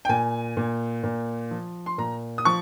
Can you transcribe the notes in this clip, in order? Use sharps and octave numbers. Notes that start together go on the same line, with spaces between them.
G5
A#2 G#5
A#2
A#2
F3
C6
A#2 A#5
D#6
F3 C#6